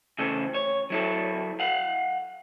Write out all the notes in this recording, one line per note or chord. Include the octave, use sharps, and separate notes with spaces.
C#3 E3 A3 A4
C#5
F#3 E4 A4
F5 F#5